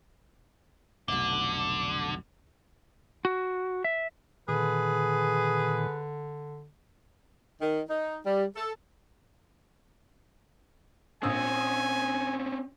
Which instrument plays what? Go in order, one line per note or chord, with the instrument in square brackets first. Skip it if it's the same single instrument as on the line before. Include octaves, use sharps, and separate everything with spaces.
[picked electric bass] F1 B1 [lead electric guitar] D3
[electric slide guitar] F#4
E5
[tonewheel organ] A#2 D#3 [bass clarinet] D3 [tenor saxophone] G#4 [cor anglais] B4
[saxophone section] D#3
D#4
G3
A4
[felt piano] A#1 D#6 E6 [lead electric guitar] C4 C#4 [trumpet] G#5